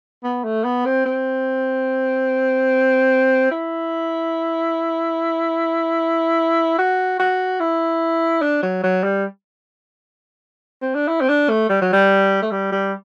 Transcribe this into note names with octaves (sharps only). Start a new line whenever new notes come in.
B3
A3
B3
C4
C4
E4
F#4
F#4
E4
D4
F#3
F#3
G3
C4
D4
E4
C4
D4
A3
G3
F#3
G3
A3
G3
G3